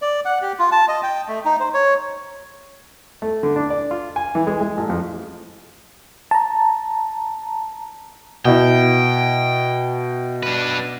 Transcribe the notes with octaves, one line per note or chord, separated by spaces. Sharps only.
D5
F#5
G4
F4
A5
D#5
G5
A3
D#4
C5
C#5
A3
D3
D4
D5
F4
G#5
E3
G#3
G#3
A1
F2
A5 A#5
B2 E4 G5
D4 B4